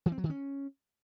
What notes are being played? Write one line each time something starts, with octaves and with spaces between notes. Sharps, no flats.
E3
C4
F#3
D#3
C#4